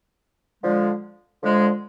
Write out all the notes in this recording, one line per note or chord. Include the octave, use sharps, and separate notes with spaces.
D3 F3 G#3
D3 F3 G#3